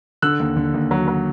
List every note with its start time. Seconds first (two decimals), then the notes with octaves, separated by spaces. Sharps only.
0.22 D3 E6 F#6
0.40 D#2
0.57 D3
0.74 D#2
0.91 F#3
1.08 F#3